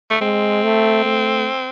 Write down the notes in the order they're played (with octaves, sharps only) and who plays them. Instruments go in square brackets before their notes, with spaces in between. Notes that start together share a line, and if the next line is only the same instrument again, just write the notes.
[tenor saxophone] A3
[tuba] G#3 [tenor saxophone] C4
[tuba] A3
A3